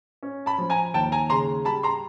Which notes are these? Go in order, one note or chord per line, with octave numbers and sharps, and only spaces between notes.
C#4
A5 B5
F3
G#5 A#5
D#2 G5 A5
G#5 A#5
C#3 A#5 C6
G3 A5 B5
A#5 C6